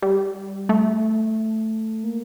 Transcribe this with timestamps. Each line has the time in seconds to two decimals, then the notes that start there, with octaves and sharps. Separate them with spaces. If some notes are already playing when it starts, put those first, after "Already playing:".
0.02 G3
0.69 A3
2.04 A#3